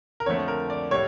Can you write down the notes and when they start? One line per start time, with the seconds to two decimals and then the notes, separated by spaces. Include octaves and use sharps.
0.20 A#4
0.26 F2 D3 F3 A3 C#5
0.48 A#4
0.70 D5
0.91 A2 G3 C#5